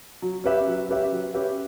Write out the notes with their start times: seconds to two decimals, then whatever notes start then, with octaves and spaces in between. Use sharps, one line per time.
0.22 F#3
0.44 C#4 G4 B4 E5
0.67 F#3
0.89 C#4 G4 B4 E5
1.12 F#3
1.34 C#4 G4 B4 E5